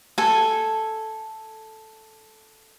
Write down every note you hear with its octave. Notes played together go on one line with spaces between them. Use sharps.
A4 G#5